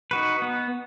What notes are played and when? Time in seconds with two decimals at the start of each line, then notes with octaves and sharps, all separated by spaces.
0.11 D#4 F#4 B4
0.42 B3